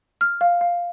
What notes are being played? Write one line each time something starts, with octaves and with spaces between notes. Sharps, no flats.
F6
F5
F5